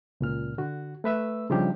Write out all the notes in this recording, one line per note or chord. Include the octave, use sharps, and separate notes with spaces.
C#2 A#2 F6
D3 F#4
A3 B4 E5 E6
C#3 F3 G3 D4 D#4 G4